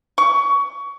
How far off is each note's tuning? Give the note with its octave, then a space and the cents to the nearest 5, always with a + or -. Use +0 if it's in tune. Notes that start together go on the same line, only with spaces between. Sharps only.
C#6 +25